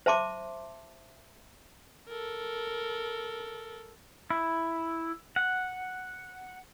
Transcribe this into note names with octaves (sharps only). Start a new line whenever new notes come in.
C5 E5 A5 C6 D6
A4 A#4
E4
F#5